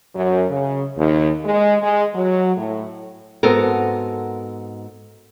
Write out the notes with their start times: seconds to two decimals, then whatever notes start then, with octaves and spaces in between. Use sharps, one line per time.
0.14 F#2
0.49 C#3
0.97 D#2
1.44 G#3
1.81 G#3
2.14 F#3
2.57 A2
3.43 G#2 B3 C4 F#4 A4 A#4